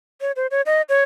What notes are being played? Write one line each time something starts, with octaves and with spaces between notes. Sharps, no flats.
C#5
C5
C#5
D#5
C#5